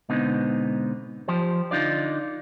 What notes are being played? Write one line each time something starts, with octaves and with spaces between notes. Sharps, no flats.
G#2 B2 D3 B3 C4 D#4
F3 G4 C5
D3 D#4 F4 D5